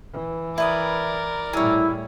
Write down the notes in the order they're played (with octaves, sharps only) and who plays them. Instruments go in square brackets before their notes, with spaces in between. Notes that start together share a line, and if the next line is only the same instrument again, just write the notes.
[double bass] E3
[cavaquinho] E4 B4 D#6 [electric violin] A#4 D5
[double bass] A2 G3 [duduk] E4 [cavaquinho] G#4 C#5